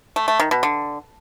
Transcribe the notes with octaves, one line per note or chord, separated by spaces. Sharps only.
A3
A3
D#3
B2
D3